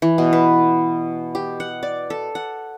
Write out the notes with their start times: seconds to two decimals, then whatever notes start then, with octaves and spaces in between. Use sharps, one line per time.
0.02 E3
0.18 B2
0.33 B4
1.35 G4
1.60 F#5
1.83 D5
2.10 A4
2.35 F#5